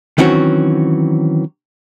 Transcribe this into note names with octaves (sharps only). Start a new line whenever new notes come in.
D#3 E3 F#3 C4 C#4 F#4